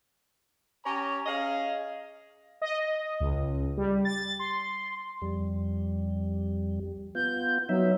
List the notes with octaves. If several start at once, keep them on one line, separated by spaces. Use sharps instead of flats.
C#4 G4 C#5 G#5 A#5
C#4 G#4 D#5 F5
D#5
D#5
C#2
G3
A6
C6
F2 G3
B3 F4 G6
F#3 B3 D#4 E5